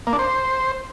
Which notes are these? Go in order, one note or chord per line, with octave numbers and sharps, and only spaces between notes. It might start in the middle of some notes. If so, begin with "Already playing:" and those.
A#3
D4
C5